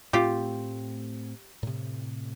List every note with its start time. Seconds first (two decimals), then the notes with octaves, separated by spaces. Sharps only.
0.13 A2 A3 C4 F4 G4
1.63 A2 C3